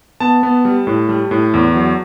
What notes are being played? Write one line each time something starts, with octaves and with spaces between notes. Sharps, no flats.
B3 A5
B3
G3
A2
G3
A2
E2
F#3